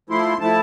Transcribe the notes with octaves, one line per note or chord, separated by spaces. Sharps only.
F3 A3 E4 C6
F3 A3 E4 A5